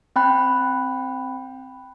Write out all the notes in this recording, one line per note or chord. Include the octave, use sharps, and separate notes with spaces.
C4 G5 B5 F#6